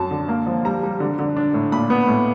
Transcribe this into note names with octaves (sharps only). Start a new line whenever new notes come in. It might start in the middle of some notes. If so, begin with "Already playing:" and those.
Already playing: F#2 A5
D3
A#3
F3
G3 A#5
G3
D3
D3
D4
A2
A#2 B5
B3
A2